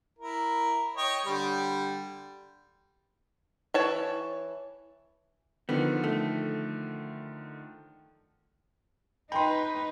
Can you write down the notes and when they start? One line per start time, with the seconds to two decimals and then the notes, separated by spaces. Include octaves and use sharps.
0.19 E4 A#4
0.97 C#5 D#5 G5
1.26 D3 G3
3.74 E3 C#5 A5
5.69 D3 D#3 F3 B3
6.04 A3
9.32 D#4 B4 G5 B5 C6